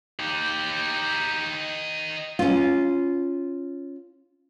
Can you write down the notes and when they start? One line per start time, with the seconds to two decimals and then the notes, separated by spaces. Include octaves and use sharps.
0.20 D#4 G4
2.39 C#4 F4